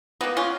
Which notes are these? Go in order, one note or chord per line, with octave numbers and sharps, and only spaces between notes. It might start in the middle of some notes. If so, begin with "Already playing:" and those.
D#3 A#3 B3 D#4
C#4 F4